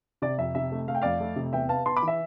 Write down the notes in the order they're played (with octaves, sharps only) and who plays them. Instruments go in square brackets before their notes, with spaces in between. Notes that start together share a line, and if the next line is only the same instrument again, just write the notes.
[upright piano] C3 D5
F2 E5
C3 E5
A3
A3 F5
G5
F2 D5 F5
A3
C3
E2 E5 G5
B3 F5 A5
B3 A5 C6
B5 D6
E3
E5